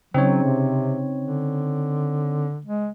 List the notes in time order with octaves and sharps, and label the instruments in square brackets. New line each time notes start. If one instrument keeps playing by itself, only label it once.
[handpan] C#3 [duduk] F#3 [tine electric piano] C4 D#4 C#5
[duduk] C3
D3
G#3